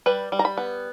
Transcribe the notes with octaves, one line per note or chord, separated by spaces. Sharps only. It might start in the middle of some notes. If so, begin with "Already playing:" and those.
G3 B4
G3
A#5
B5
B3